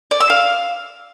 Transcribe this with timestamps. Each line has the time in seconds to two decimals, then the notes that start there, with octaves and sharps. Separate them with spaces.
0.11 D5
0.20 E6
0.30 F5